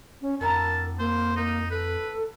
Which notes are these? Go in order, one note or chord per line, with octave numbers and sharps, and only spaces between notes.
C#4
F2 A2 D3 A#4 A5 A#5
A#3 C5
A#3 D#4
A4 B4